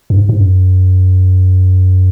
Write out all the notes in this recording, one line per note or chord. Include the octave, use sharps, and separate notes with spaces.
F#2
G#2
G#2
F#2